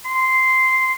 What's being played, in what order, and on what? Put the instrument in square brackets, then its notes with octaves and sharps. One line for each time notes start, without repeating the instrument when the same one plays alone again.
[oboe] C6